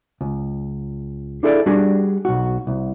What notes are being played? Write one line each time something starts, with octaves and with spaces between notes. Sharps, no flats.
C#2
D4 E4 G#4 A4 B4 D5
G3 D4 F#4 G#4
B1 F#4
C2